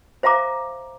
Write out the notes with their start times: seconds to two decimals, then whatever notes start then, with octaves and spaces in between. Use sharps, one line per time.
0.23 C5 E5 F5 A#5 D6